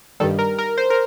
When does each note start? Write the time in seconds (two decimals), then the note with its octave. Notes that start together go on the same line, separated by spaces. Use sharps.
0.20 G2 D#3 G3 A4
0.39 A#4
0.59 A#4
0.78 C5
0.90 A#4